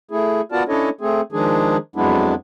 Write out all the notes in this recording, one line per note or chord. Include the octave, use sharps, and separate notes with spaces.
A3 E4 G#4
B3 F4 F#4 A#4 D5 A5
C#4 D4 E4 A4 C#5 D#5
A3 C4 G#4
D#3 F3 G#3 D4 G#4
F2 F#3 G#3 B3 D4 E4